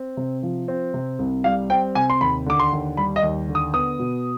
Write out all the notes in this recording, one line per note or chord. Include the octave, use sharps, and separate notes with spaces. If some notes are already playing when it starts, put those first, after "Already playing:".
Already playing: C4
C3
F3
C4
C3
C2
G3 F5
C4 G5
C3 G#5
C6
D#2 B5
D3 D6
C6
D#2
G3 B5
D#5
D#2
D3
D#6
B3 D#6
B2